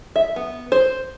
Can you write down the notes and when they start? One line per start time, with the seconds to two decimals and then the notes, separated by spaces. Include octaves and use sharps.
0.16 E5
0.36 B3
0.72 C5